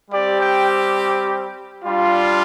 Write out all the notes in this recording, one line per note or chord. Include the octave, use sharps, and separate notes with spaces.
G3 C4 G4 D5
G5
G3 D4 F4